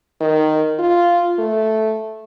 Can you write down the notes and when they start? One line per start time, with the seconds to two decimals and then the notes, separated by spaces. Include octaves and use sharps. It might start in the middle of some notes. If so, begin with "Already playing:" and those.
0.21 D#3
0.79 F4
1.39 A3